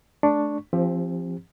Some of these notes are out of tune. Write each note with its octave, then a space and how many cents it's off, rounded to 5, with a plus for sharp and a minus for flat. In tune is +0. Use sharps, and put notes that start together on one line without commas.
A3 -30 D4 +0 C#6 +0
F3 -20 C4 +15 G4 +25